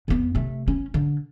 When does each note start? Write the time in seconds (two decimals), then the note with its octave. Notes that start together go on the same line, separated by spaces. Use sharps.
0.08 F2 B3
0.35 C3 A3
0.68 C#4
0.94 D3